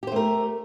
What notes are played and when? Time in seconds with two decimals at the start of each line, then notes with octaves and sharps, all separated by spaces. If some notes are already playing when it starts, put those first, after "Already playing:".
0.03 G4
0.07 C5
0.12 A3
0.16 A#4